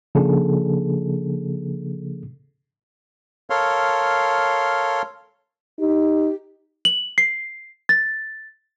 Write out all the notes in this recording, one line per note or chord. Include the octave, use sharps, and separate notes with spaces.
C#3 F3 A#3 D4 G#4 A4
A4 A#4 C#5 F5 C6
D#4 G4
F#7
C7
A6